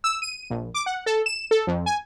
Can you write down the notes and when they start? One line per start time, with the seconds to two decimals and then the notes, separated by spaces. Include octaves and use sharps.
0.04 E6
0.22 D#7
0.50 A#1
0.74 D6
0.86 F#5
1.06 A4
1.26 E7
1.51 A4
1.67 F2
1.86 G#5